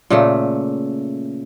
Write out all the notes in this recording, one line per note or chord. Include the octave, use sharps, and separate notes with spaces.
A#2 C#3 A3